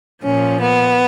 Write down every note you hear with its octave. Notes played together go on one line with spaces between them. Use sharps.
A#2 F3 C#4
B3